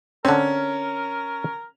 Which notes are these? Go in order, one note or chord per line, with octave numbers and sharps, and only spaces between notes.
D3 C4 C#4 A#4